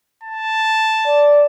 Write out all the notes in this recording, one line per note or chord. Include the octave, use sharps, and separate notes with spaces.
A5
D5